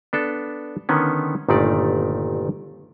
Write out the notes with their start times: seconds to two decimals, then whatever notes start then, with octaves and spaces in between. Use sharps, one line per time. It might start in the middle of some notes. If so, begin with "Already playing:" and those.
0.13 B3 D4 A4
0.89 D3 D#3 B3 C#4
1.49 G1 A#2 D#3 A3 D#4 D5